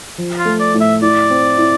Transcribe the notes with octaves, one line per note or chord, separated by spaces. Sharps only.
F3
F4
A3
D5
A2
E5
E4 D5
C4
E4